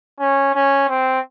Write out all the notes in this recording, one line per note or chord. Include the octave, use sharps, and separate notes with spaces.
C#4
C#4
C4